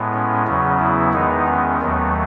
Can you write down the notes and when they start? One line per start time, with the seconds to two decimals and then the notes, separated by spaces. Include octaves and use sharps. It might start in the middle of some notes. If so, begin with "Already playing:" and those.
Already playing: A2 G#3 B3
0.14 C#4
0.47 E2 C#3 F#3 B3 C#4
0.80 E4
1.13 E2 D#3 G#3 B3 D#4
1.47 C#4
1.81 D#2 D#3 F#3 A3 B3